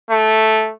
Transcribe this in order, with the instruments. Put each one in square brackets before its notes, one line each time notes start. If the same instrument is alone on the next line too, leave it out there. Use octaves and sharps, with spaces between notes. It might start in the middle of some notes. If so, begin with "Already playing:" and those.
[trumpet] A3